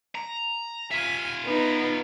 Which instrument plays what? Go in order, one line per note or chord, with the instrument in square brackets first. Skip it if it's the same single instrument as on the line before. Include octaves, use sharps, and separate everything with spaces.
[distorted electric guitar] A#5
[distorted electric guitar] F4 E5 [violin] G#5
[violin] B3 D#4